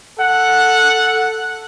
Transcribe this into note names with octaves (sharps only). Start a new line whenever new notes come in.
A4 F#5